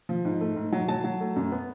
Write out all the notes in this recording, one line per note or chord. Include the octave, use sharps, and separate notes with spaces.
F3
G#2
A3
G#2
F#3
F#3 A5
F#3
A3
F#2
B3